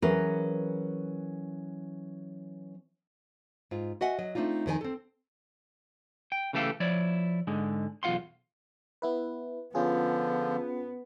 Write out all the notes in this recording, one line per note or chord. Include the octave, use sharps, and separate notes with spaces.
E3 F#3 C#4 G#4 A#4 B4
G#2 F4
F#4 D#5 E5 F#5 G#5
F#3 D#5
A3 C4 D4 D#4 F4
F2 D#3 A4 G#5
C4 A4
G5
C#3 E3 A3 G4 A4 F5
F3 E4 C#5 D5
G#2 D3 G#3
B1 E2 F4 F5 F#5 C6
B3 E4 B4
D3 F3 B3 C#4 F4 G#4